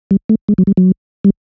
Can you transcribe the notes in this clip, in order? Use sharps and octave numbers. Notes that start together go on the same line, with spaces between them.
G3
A3
G#3
F#3
G3
F#3
G3